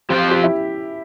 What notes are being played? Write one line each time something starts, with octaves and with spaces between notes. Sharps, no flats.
F3 C4 F4 G4 C5
G4
E4